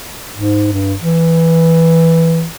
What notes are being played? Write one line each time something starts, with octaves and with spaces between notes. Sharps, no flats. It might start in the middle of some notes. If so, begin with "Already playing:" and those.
G#2
G2
E3